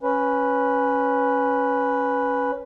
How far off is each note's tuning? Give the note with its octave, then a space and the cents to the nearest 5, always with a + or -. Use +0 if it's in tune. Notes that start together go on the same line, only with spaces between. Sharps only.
C#4 +0 B4 +0